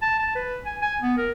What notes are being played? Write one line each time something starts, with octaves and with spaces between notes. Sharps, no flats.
A5
A5
B4
G#5
G#5
B3
A#4